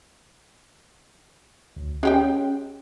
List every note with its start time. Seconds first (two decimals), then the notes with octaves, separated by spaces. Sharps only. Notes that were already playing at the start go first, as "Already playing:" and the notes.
1.76 D2
2.03 G#3 C#4 G4 G5